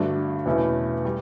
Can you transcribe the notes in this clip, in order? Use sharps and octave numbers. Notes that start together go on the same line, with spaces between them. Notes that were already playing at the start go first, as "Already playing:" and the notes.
Already playing: G2 D3 A3 D4 F#4
E2 B2 A3 C#4 E4
G3